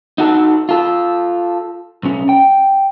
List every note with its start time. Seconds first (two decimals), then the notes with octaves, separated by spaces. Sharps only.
0.18 D#4 F#4 A4
0.69 F4 A4
2.03 B1 C#4
2.29 G5